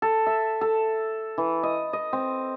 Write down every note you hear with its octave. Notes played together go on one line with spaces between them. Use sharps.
A4
E5
A4
E3
D#5
D#5
C4